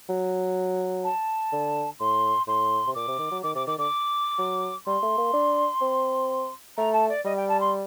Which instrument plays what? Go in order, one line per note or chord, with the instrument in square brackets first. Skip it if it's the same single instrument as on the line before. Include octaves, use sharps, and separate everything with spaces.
[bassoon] F#3
[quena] A5
[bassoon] D3
[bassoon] A2 [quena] C6
[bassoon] A2 [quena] C6
[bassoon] C3
[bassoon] A#2 [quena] D6
[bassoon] C3
D#3
F#3
[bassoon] D#3 [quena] D6
[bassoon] C3 [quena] D6
[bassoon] D#3 [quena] D6
[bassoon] D3 [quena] D6
[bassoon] F#3
[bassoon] G3 [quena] C6
[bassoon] A3
A#3
D4
C4
[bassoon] A3 [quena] A#5
[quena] A5
D5
[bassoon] G3 [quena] D#5
[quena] G5
A5
C6